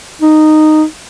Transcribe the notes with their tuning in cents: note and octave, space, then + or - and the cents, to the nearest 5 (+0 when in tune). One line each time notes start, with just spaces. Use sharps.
D#4 -10